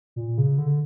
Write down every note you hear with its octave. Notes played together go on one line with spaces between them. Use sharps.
A#2
C#3
D3